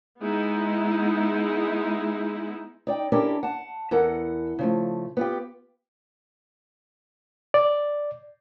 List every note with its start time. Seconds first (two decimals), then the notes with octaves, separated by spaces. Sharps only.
0.21 G#3 B3 D#4 E4
2.87 D#4 D5 G5
3.12 C#4 D4 E4 G4 A4 A#4
3.43 F#5 A5
3.91 E2 B3 A4 A#4 F#5
4.59 C#3 F3 A3
5.17 B3 F4 G4
7.54 D5